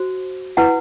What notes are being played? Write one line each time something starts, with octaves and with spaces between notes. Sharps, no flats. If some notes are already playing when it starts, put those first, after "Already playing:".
Already playing: F#4 C5
E4 B4 F#5